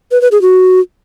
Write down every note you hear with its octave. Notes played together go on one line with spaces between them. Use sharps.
B4
B4
G#4
F#4